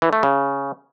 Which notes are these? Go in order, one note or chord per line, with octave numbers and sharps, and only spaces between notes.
E3
A3
C#3